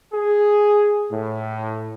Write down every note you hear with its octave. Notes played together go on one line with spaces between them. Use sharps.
G#4
A2